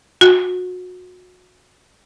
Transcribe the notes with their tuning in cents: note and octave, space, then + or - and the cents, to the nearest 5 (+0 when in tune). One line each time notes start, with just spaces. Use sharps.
F#4 -30